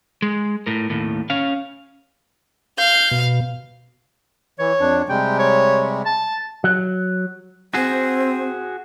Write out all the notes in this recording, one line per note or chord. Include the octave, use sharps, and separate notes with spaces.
G#3
A2 A#4
D#2 A2
C#4 F5
F5 G6
B2
E3 C#5
F2 D4
C3 G3 G#3 G5
C#5
A5
F#3
C4 F#4 G#4